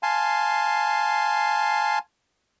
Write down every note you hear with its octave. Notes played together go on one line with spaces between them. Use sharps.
F5 G#5 A5 C6